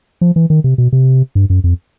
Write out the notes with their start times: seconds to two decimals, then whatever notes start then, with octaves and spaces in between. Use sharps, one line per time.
0.21 F3
0.36 E3
0.50 D#3
0.64 C3
0.78 B2
0.93 C3
1.35 G2
1.50 F#2
1.64 F2